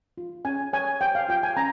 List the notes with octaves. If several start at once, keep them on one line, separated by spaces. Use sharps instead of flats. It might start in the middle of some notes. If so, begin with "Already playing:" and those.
F4
C#4 G#5
C#5 G#5
C5 G5
F5
F4 G5
G#5
C#4 A#5